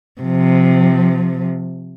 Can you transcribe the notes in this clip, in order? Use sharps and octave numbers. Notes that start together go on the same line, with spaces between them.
C3 F3